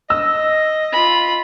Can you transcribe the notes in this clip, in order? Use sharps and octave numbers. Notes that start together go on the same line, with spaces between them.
D#5 E6
F4 B5